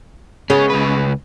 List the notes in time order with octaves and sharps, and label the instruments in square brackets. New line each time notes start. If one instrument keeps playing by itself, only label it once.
[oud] C#3 G#3 B3 [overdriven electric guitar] C#4
[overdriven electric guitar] C#2 B4